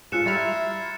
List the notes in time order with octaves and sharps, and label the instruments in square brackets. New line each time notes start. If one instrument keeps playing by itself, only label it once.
[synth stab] G#2 F4 [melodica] C#4 A4 A5 [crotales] F#6 C#7 E7
[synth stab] G3 E5 F6 [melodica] E4 A#5 C6 [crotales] A6